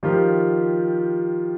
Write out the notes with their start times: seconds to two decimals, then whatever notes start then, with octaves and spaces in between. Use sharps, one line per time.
0.03 D#3 F3 F4 G4